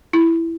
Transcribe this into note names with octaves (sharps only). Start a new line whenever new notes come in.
E4